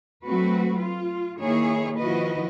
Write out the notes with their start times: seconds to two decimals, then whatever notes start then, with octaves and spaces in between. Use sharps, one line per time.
0.26 F#3 A3 C4 F#4 B4
0.80 F4
1.40 D#3 A#3 E4 G#4 C#5
1.98 D#3 F3 E4 F#4 B4 D#5